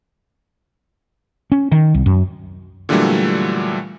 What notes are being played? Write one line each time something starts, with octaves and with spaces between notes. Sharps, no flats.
C#4
D#3
C2
F#2
A#2 D3 E3 F#3 G3 A3